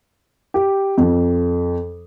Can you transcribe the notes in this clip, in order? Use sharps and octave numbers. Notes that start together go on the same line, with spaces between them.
G4
F2